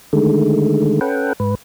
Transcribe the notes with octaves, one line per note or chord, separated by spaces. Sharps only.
D3 D#3 G#3 A3
C#4 A4 B4 F#5 G5
G#2 B4